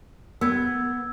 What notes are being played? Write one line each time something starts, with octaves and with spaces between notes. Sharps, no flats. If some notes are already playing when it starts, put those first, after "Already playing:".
B3 E6 G#6